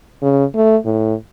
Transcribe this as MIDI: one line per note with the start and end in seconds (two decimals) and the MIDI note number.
0.22 0.45 49
0.55 0.76 57
0.85 1.14 45